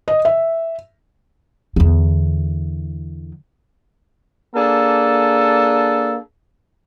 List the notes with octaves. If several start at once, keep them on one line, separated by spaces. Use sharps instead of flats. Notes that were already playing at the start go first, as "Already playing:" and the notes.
D#5
E5
E2 D3
A#3 D4 G#4 A4